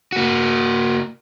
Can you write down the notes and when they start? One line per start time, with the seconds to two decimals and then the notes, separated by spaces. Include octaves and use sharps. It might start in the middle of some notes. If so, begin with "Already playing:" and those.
0.12 A#3 F#4